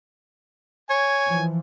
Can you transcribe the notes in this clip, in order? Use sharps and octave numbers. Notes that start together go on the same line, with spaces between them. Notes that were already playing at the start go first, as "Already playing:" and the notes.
C#5 G#5
E3 F3